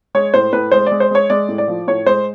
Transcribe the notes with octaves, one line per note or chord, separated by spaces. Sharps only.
G#3 C#5
A2 C5
A2 B4
G#3 C5
G#3 D5
C5
G#3 C#5
G#3 D5
A2
D5
F3
A2 C#5
G#3 C5